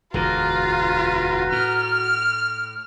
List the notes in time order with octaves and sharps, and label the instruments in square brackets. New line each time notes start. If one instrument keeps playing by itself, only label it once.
[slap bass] E1 D2 D3 [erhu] F4 [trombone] F#4 [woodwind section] B4 A#5
[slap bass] A2 [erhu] F6